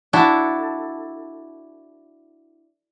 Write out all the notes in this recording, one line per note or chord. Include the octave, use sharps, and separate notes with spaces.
D4 E4 F#4 A4